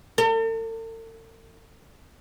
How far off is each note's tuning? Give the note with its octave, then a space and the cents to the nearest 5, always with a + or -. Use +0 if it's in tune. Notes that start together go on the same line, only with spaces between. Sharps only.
A4 +45